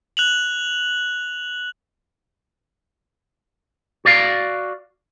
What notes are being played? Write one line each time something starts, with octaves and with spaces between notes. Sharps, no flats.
F#6 F7 F#7
F#4 D5 F5